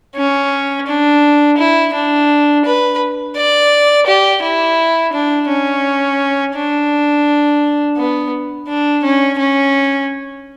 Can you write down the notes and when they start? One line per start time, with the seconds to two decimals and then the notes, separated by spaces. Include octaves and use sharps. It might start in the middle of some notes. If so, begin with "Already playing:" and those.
0.16 C#4
0.87 D4
1.57 E4
1.93 D4
2.65 B4
3.36 D5
4.06 G4
4.42 E4
5.13 D4
5.48 C#4
6.54 D4
7.97 B3
8.68 D4
9.03 C#4
9.39 C#4